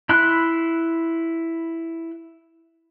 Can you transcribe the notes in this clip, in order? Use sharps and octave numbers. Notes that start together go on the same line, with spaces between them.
E4 B5 C6 F#6